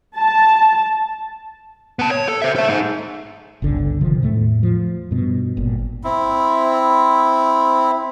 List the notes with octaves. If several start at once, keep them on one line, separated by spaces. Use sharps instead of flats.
A5
B3 A5
C#5
A4
C5 E5
A4 E5
D#4 G#4
G1 C#2 D3
C3 D#3 F3
E2 A2 A3
F3
G2 B2
G1 A#2
C4 E4